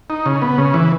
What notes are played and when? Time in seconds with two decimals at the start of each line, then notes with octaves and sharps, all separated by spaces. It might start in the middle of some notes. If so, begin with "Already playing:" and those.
0.10 D#4
0.26 C#3
0.42 B3
0.58 C#3
0.74 E3